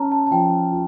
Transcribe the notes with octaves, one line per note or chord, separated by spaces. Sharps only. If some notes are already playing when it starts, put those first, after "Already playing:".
Already playing: C#4 A5 A#5
A5
A5
F3 G5
F4